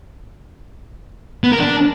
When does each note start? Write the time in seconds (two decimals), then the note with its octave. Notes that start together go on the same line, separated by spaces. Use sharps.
1.44 B3
1.52 A#4
1.60 D4